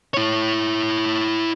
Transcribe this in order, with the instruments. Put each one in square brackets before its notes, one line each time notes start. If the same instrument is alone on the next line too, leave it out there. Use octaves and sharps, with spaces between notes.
[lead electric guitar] E4 C#5